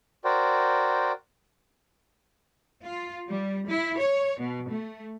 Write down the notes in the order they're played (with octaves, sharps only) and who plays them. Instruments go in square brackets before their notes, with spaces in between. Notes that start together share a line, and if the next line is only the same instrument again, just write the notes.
[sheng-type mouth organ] F#4 A#4 C5 D5 G5
[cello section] F4
G3
E4
C#5
B2
A3